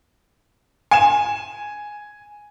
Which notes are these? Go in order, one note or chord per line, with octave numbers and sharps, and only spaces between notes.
G#5 E7